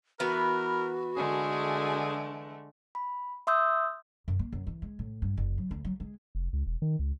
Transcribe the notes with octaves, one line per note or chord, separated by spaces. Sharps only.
E3 B3 F#4 A#4 B4
D3 G#3 A3 G#4
B5
E5 C6 D#6 E6 G6
F#2
A#3
F#2
E3
G#3
A2
G2
F#1
F#3
D2
F#3
G#3
F1
C#2
E1
D#3
C#2